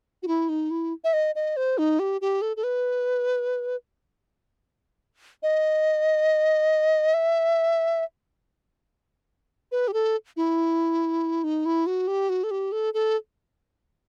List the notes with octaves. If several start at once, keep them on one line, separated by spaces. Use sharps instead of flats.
F#4
E4
D#4
E4
E5
D#5
D#5
C5
D#4
G4
G4
A4
A4
B4
D#5
E5
B4
G4
A4
E4
D#4
E4
F#4
G4
F#4
A4
G4
A4
A4